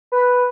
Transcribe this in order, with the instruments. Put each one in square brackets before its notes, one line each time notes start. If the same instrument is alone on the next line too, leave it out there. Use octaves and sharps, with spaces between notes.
[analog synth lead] B4